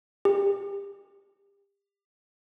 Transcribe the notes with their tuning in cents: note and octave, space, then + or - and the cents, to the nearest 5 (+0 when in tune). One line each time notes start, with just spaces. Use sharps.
G4 +30